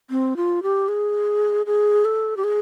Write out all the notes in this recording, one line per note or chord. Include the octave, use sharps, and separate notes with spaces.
C4
F4
G4
G#4
G#4
A4
G4
G#4